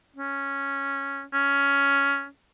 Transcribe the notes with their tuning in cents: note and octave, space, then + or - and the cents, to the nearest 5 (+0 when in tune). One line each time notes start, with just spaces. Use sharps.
C#4 -5
C#4 +10